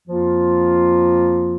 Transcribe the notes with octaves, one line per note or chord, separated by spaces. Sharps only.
F2 F3 A#3 F4